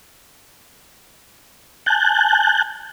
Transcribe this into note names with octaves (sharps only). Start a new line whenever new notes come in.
G#5 A5 F#6 G6